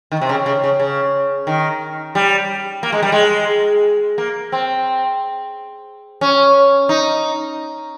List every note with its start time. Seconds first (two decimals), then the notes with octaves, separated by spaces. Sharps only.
0.12 D#3
0.21 C3
0.29 C#3
0.46 C#3
0.64 C#3
0.80 C#3
1.47 D#3
2.15 G3
2.83 A#3
2.92 G#3
3.03 G3
3.12 G#3
4.18 A#3
4.52 C4
6.21 C#4
6.89 D#4